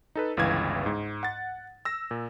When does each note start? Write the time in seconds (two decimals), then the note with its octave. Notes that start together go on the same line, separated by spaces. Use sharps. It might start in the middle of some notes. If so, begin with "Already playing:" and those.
0.15 D#4 A4 B4
0.37 G1 C#2 E3 F5 G#6
0.86 G#2
1.23 F#5 A6
1.85 E6 A#6
2.11 A#2